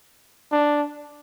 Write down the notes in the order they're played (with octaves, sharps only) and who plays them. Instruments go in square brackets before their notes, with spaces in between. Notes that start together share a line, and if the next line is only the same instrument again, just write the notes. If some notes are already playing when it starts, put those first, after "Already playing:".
[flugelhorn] D4